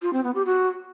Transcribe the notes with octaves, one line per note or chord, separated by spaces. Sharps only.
F4
C4
B3
G4
F#4